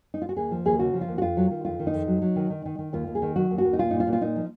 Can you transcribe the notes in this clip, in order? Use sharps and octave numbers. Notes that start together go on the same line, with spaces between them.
D#4
F4
F#4
D#2 G#4
F3
D#2 G#4
C#3 F#4
F3
F4
D#2
F#4
F2 F4
F#3
D#3
F2 F4
D#3
D#4
F2
F#3
F#3
D#3
D#3
D#3
D#3
D#2 F4
D#2
G#4
D#3
F#3 F#4
D#2
F#4
D#2
D#4
A#2 F4
A#2 D#4
F4
A#2
F4
A#2 D#4
F3